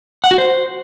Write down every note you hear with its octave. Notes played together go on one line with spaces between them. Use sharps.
F#5
F#4
C5